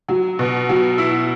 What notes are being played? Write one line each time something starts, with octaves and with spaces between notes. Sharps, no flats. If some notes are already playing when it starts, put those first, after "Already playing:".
F#3
B2
F#3
E4